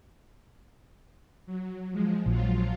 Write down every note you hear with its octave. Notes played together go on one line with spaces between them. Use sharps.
F#3
F3 G#3
A#1 F3 F#3 F4